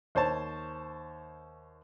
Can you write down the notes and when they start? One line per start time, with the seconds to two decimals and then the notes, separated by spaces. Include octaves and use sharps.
0.15 D#2 C5 C#5 A5